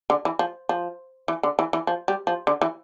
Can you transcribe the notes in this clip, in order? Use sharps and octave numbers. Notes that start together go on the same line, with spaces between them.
D3
E3
F3
F3
E3
D3
E3
E3
F3
G3
F3
D3
E3